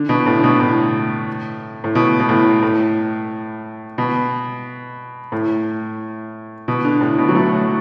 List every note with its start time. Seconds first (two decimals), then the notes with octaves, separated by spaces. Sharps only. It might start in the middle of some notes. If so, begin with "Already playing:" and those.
Already playing: D3
0.09 B2
0.26 A2
0.39 D3
0.44 B2
0.60 A2
1.84 A2
1.95 B2
2.20 B2
2.29 A2
2.63 A2
3.98 B2
5.32 A2
6.68 B2
6.85 D3
7.01 A2
7.18 B2
7.29 F#3
7.35 A3